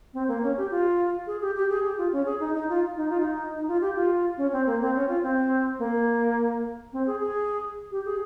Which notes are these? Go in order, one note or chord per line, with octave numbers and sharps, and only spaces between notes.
C4
A#3
C#4
G4
F4
G#4
G4
G4
G#4
G4
F4
C#4
G#4
D#4
D#4
F4
D#4
F4
D#4
D#4
F4
G4
F4
C#4
C4
A#3
C4
C#4
F4
C4
A#3
C4
G#4
G#4
G4
G#4